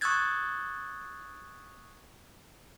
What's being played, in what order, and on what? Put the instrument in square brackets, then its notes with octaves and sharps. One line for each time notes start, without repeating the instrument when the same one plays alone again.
[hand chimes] C#6 D#6 E6 F#6 G#6 A6